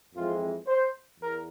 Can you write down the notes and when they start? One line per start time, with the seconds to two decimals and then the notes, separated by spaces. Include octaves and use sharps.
0.14 F2 E3 G#3 C4 F4
0.67 C5
1.19 E2 A#4